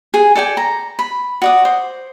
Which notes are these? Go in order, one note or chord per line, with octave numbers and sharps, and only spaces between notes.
G#4 G#5
A4 D5 G5 G#5
A#5
B5
F#4 D5 D#6
C5